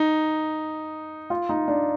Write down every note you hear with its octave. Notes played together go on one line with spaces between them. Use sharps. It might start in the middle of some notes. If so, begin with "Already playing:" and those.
Already playing: D#4
F4
D#4
D4